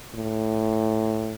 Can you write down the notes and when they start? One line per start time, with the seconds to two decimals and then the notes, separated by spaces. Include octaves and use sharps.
0.14 A2